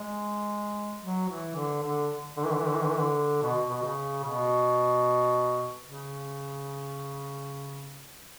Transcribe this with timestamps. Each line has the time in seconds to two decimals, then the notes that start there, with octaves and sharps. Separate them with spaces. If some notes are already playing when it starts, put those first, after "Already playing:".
Already playing: G#3
1.02 F#3
1.29 E3
1.55 D3
1.83 D3
2.37 D3
2.44 E3
2.52 D3
2.59 E3
2.67 D3
2.75 E3
2.83 D3
2.90 E3
2.98 D3
3.43 B2
3.69 B2
3.83 C#3
4.24 B2
5.85 C#3